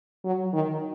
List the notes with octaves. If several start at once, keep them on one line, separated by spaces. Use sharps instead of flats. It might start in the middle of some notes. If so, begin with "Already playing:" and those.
F#3
D#3